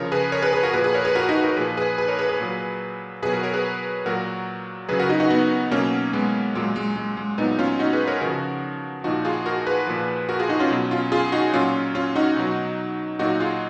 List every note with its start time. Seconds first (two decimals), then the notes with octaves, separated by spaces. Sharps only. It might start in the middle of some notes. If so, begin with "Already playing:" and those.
Already playing: C#3 F3 A#4 C#5
0.12 G#4 B4
0.32 A#4 C#5
0.42 G#4 B4
0.53 G#4 B4
0.63 F#4 A#4
0.73 A#2 F3 G#4 B4
0.84 G#4 B4
0.94 A#4 C#5
1.05 G#4 B4
1.15 F#4 A#4
1.29 D#4 F#4
1.43 F#4 A#4
1.56 A#2 F3 G#4 B4
1.77 G#4 B4
1.98 G#4 B4
2.08 A#4 C#5
2.19 G#4 B4
2.29 G#4 B4
2.40 A#2 F#3
3.22 B2 F#3 G#4 B4
3.33 F#4 A#4
3.43 A#4 C#5
3.54 G#4 B4
4.06 A#2 F#3 F#4 A#4
4.89 C#3 F#3 G#4 B4
4.99 F#4 A#4
5.10 D#4 F#4
5.20 D#4 F#4
5.30 B3 D#4
5.71 B2 F#3 A#3 C#4
6.13 G#3 B3
6.55 A#2 F#3 G#3
6.76 G#3
6.96 G#3
7.17 G#3
7.38 A#2 F#3 B3 D#4
7.59 C#4 F4
7.79 D#4 F#4
7.93 G#4 B4
8.07 A#4 C#5
8.21 C#3 F3 F#4 A#4
9.04 A#2 F3 D#4 F#4
9.25 F4 G#4
9.46 F#4 A#4
9.66 G#4 B4
9.87 A#2 F3
10.29 F#4 A#4
10.39 F4 G#4
10.49 D#4 F#4
10.60 C#4 F4
10.70 B2 F#3
10.91 C#4 F4
11.12 F4 G#4
11.32 D#4 F#4
11.53 A#2 F#3 C#4 F4
11.95 C#4 F4
12.16 D#4 F#4
12.36 B2 F#3
13.19 A#2 F#3 D#4 F#4
13.40 F4 G#4